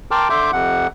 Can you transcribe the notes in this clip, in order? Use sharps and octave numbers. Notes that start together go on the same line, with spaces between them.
A#4 G5 A5 C6 D6 F6
D3 E5 C6 D6 G6
F2 C3 F#5